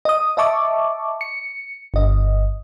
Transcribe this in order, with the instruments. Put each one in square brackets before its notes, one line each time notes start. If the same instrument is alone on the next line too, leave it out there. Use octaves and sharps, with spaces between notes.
[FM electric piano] D#5 D#6
D#5 E5 A5 C#6 D6
C#7
G1 D#5